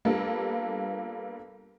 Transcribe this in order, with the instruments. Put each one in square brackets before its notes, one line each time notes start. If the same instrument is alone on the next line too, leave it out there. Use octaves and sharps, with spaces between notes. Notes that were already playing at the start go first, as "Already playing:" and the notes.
[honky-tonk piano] G3 A#3 B3 D4 F4 A4